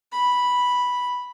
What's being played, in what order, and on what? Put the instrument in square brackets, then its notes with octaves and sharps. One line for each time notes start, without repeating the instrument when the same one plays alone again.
[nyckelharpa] B5